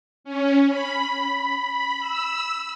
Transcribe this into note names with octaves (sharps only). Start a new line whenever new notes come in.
C#4
B5
E6